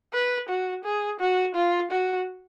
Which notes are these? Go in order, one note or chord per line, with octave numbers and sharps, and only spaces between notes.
B4
F#4
G#4
F#4
F4
F#4